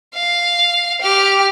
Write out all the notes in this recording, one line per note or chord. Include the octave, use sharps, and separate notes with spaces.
F5
G4 F6